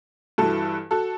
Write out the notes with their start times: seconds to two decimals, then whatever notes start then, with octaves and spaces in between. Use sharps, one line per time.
0.38 G2 E3 F#4 A4
0.91 F#4 A4